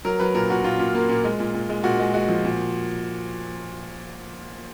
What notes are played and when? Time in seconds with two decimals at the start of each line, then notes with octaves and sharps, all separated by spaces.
0.05 F#3 A#4
0.19 F#3 B4
0.34 A#2 A#4
0.50 A#2 F#4
0.64 A#2 F4
0.79 A#2
0.95 A#3
1.09 A#2
1.24 G#3
1.40 A#2
1.54 A#2
1.69 G#3
1.84 A#2 F#4
1.99 G#3
2.14 G#3 F#4
2.29 F3
2.45 A#2